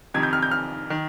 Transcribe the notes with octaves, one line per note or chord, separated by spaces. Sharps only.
F2 C3 D#3 G#6
G6
F6
G6
F6
D#3